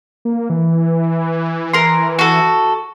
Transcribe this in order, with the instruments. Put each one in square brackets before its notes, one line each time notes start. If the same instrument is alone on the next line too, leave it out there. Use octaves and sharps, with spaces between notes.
[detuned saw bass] A#3
E3
[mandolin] A#4 C6
F#4 A4